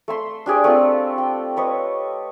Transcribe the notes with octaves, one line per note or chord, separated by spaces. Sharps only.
A3 E5 C6
D4 G4 G#4 D5
A3 C4 F4
G5
B4 C#5 D#5